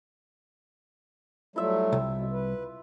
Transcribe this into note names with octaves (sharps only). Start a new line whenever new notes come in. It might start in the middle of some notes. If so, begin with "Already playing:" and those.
F#3 G3 A3 E4 F4 E5
C2
B2
B4